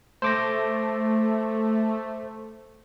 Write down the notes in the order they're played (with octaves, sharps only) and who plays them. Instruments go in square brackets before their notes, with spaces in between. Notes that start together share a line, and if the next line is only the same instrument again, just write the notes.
[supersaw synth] A3 [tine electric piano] C5 D6 A#6